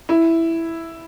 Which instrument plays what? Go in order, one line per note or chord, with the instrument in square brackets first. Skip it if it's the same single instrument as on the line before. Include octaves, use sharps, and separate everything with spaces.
[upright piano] E4